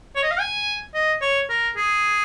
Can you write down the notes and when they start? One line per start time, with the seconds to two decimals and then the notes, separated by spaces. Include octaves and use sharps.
0.16 C#5
0.23 D#5
0.31 F5
0.40 G#5
0.94 D#5
1.21 C#5
1.49 A#4
1.76 G#4